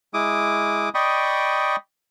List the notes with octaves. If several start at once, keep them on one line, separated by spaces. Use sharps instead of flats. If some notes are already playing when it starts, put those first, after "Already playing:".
G#3 E4 D6 D#6
D5 D#5 G5 B5 C#6 D#6